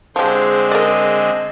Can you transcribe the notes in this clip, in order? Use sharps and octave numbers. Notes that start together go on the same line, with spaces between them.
D3 F3 G#3 C4 G4 G#4 C5
A#4 D5 D#5